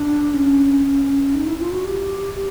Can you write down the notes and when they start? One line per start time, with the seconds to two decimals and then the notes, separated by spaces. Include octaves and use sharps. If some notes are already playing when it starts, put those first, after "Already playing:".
Already playing: D4
0.34 C#4
1.34 D#4
1.46 E4
1.60 F4
1.71 F#4
1.85 G4
2.34 G4